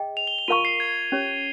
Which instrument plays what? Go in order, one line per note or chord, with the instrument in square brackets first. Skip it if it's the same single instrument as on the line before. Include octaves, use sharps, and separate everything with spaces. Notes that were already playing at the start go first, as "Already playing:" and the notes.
Already playing: [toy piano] G#4 D#5 G5
[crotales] F7
G7
F7
[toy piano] F4 A#4 F5 A#5 C#6 [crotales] D#7
[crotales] C7
G#6
[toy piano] C#4 G4 C#5